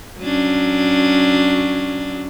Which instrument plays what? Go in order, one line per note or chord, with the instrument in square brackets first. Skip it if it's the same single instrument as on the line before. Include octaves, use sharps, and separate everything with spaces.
[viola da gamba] F#3 C#4 D4